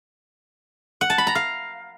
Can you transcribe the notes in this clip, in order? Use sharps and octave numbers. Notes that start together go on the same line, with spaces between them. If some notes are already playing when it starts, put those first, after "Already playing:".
F#5
A5
B5
A#5
F5